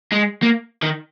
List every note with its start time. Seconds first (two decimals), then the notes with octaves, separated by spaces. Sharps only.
0.12 G#3
0.42 A#3
0.82 D#3